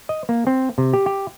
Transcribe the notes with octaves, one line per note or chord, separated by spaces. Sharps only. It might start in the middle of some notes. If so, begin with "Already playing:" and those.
D#5
A#3
C4
C3
G4
G4